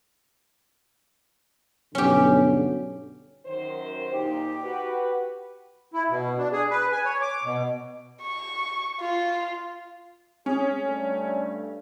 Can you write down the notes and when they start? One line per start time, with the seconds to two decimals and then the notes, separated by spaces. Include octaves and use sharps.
1.95 B1 G2 D3 C#4 G4
3.46 F#2 D#3 C5
4.13 A#2 D#4 G4
4.63 F#4 B4
5.94 E4
6.10 B2
6.38 D4
6.52 G#4
6.71 B4
6.92 G#5
7.05 C#5
7.21 D6
7.44 B2
8.22 C#6
9.01 F4
10.46 C#4 G#4
10.83 G2 G3 A3